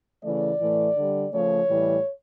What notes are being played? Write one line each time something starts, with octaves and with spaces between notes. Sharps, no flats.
C#3 E3 A3 D5
A2 E3 A3
D3 G3
C#3 F3 A3 C#5
A2 E3 G3